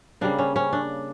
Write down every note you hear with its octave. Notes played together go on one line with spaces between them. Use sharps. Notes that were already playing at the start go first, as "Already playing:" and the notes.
C#3 G3 A#3 D4
C#4
C#4
D4